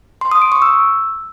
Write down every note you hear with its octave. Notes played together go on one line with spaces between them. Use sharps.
C6
D#6
D7
C#6
E6